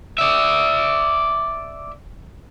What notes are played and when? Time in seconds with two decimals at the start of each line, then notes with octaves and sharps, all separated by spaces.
0.18 D5 E5